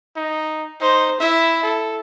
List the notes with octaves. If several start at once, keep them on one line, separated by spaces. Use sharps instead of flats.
D#4
D#4 C5
E4 E5
A4